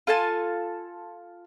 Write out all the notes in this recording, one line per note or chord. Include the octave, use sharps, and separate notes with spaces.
F4 A4 G#5 A5